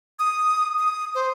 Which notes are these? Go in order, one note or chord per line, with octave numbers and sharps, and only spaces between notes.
D#6
D#6
C5